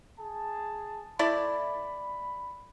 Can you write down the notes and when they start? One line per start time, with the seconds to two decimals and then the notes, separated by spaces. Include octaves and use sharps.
0.20 G#4 A5
1.19 A3 E4 D5 B5